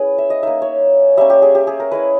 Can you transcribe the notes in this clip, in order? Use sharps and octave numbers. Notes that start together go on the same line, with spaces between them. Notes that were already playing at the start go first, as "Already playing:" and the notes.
Already playing: C#4 E4 G#4 B4
E5
D#5
A#3 D#4 E5
C#5
G3 A#3 C#4 E5
G4
G#4
G4
G#4
A#4
G#3 C#4 E4 B4